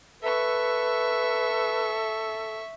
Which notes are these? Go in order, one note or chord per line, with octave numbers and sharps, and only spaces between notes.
A4 B4 E5 C#6